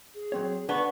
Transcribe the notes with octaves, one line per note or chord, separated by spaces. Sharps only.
G#4
F#3 C4 C#5
B3 D4 F#5 A5 C#6